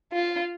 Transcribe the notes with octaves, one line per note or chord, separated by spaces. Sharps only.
F4